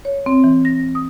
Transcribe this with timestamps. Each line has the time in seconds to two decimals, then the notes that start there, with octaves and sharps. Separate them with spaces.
0.05 C#5
0.26 C4
0.44 E3
0.65 A#6
0.95 D#6